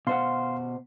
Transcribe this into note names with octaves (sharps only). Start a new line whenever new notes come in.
B2 C5 F5 F#5 C6